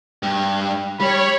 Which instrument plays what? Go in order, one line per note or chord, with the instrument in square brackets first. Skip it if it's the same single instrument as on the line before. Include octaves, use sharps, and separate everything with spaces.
[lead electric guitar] G2
[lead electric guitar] G3 [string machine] C#5 [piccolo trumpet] B5